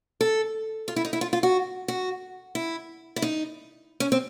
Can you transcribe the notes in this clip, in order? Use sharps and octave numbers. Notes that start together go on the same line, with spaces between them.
A4
F4
E4
D#4
E4
F4
F4
F#4
F#4
E4
E4
D#4
C#4
C4